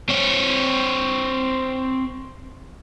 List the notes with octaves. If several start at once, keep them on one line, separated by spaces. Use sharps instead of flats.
C4 C#5